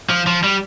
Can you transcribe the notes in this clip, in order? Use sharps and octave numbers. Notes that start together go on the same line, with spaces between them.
F3
F3
G3